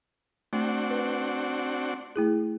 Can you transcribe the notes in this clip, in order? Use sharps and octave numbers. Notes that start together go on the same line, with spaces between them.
A3 C4 D4 F#4
B4
A3 E4 G#4